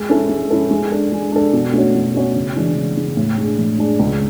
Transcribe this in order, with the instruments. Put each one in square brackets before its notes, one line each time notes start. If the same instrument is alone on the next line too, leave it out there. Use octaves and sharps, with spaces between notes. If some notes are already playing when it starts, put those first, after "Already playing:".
Already playing: [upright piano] G#3
C#4 E4 A4
G#3
C#4 E4 A4
G#3
D4 A4
G#3
D4 A4
B2
A3 C#4 F#4 C#5
B2
A3 C#4 F#4 C#5
C#3
E3 G#3 D4
C#3
E3 G#3 D4
A2
G#3 D4 G#4
A2
G#3 D4 G#4
C#2